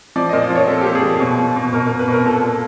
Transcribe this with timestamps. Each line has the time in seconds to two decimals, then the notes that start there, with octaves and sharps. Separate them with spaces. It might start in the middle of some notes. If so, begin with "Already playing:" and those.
0.16 F3 D5
0.29 A#2 D#5
0.42 D5
0.50 F3
0.55 C#5
0.68 A#2 A4
0.81 G4
0.86 A#2
0.95 G#4
1.03 F3
1.20 B2
1.38 B2
1.56 B2
1.73 B2 A#4
1.86 B2 A#4
1.99 B4
2.08 B2
2.13 A#4
2.26 A#2 A4
2.44 A#2